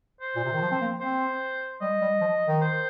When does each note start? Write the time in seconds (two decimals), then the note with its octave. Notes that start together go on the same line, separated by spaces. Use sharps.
0.21 C5
0.36 A#2
0.44 C3
0.53 D#3
0.62 F3
0.71 C4
0.81 A#3
1.01 C4 C5
1.81 G3 D#5
2.01 G3
2.21 F3
2.47 D#3
2.62 C5